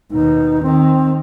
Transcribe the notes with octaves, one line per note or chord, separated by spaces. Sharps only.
D#2 B2 D#4
D#3 C4